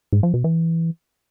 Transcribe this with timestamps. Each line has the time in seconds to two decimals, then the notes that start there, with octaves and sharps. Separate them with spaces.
0.13 G#2
0.23 F3
0.34 B2
0.44 E3